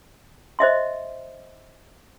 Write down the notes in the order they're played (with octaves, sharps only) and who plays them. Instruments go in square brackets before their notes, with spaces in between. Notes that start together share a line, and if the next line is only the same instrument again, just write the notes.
[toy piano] C5 D#5 E5 C6